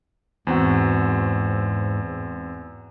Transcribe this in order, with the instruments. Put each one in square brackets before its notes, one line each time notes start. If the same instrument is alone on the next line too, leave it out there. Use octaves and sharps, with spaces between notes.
[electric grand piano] E2 C4 F#4 [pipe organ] G#2